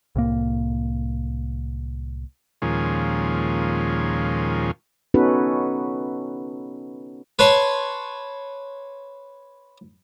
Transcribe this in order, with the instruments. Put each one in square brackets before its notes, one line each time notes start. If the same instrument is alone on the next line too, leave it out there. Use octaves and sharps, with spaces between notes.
[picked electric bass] C2 A2 A#3
[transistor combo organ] D#2 A#2 F3 G#3 C#4
[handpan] B3 C#4 D#4 F#4 A4 B4
[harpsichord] B4 C#5 A5 C6